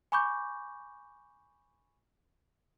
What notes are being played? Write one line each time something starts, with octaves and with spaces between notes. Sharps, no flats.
G#5 B5 C#6 D6 G6